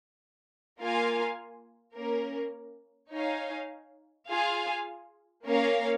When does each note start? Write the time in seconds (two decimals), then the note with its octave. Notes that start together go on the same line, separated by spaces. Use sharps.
0.79 A#3 F4 A#4 F5 G#5
1.95 A#3 C#4 A#4
3.12 D#4 C#5 F5 G#5
4.28 F4 G#4 F5 G#5
5.44 A#3 C#4 A#4 C#5 F5